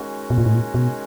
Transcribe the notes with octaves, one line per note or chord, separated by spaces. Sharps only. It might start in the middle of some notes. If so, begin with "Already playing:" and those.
Already playing: D#3 G#3 C#4 F#4
B2
A#2
A2
A#2
B2